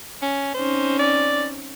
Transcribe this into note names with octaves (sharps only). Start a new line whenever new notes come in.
C#4
C4 C#4 D#4 C5
D5